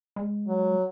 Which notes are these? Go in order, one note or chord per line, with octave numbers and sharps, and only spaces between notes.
G#3
F#3